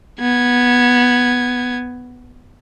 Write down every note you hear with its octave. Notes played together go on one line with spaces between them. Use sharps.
B3 G#6